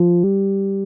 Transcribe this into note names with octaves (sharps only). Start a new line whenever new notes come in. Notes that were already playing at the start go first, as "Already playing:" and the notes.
Already playing: F3
G3